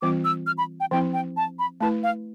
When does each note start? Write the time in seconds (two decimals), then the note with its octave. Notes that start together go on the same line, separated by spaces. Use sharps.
0.02 E3 G3 C4 F4 D6
0.25 E6
0.47 F6
0.58 B5
0.80 G5
0.91 F3 C4 E4 G5
1.13 G5
1.37 A5
1.59 B5
1.81 A3 E4 B4 A5
2.03 F5